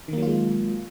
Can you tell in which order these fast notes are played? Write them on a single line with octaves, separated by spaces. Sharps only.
D#3 A#3 F#3 F4 G#3